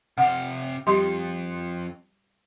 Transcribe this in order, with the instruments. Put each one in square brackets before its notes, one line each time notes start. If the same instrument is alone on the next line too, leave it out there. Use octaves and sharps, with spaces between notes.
[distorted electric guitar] C3 F5 [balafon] F#5
[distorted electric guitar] F2 [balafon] G3 G4 C6